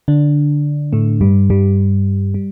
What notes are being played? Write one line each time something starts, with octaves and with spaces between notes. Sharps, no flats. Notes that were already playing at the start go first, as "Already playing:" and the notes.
D3 D4
A2 A3
G2 G3
G2 G3
G3